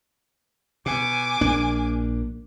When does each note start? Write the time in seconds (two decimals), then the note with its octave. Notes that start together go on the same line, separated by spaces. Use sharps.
0.86 B2 G#5 D6
1.41 A#1 A#3 D4